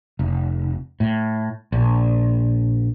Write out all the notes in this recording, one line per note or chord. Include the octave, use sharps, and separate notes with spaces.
F1
A2
A#1